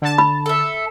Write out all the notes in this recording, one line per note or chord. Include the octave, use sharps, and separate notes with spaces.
D3 A5
B5
A4 E5